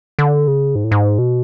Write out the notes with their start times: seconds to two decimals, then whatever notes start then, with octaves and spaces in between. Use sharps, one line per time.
0.19 D3
0.47 C#3
0.75 G#2
0.84 A2
0.91 G#2
1.19 B2